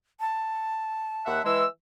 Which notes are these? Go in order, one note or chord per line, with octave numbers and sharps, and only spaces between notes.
A5
D#2 E5 F#5
E3 G#3 E6